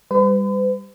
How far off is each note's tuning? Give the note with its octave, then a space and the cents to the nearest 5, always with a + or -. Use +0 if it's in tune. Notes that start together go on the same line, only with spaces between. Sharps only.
G3 +20 B4 +45